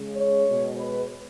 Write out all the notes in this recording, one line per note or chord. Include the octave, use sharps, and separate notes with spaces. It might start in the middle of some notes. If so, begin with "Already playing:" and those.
Already playing: C#3 G#3
C#5
B2 G#3
B4